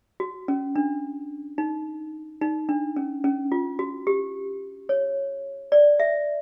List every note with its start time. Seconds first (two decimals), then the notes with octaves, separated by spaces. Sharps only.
0.20 F#4
0.48 C#4
0.76 D4
1.58 D#4
2.42 D#4
2.69 D4
2.96 C#4
3.24 C#4
3.52 F4
3.79 F#4
4.07 G4
4.89 C#5
5.72 D5
6.00 E5